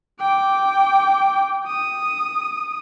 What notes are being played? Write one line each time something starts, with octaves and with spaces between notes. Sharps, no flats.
G5 D6
D#6